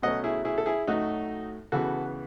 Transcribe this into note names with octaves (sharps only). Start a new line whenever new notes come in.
B2 F#3 A3 C#4 D#5 F#5
E4 G#4
E4 G#4
A4
E4 G#4
A2 F#3 A3 D#4 F#4
C#2 C#3 E3 B3 F#4 A4